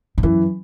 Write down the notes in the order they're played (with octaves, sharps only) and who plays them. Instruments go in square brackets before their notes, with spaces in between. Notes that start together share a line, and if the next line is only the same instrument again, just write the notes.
[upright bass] A2
[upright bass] F#2 [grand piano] E3